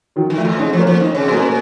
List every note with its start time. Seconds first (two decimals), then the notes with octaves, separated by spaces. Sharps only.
0.16 D#3 F#3
0.30 D#3
0.38 F3 A3
0.45 A2
0.58 C#3 C4 D#4
0.73 F3
0.79 A#3 C#4
0.87 F3
1.00 D#3 D#4
1.11 C#3 C#4
1.22 C4
1.28 A#2 A#3 C#4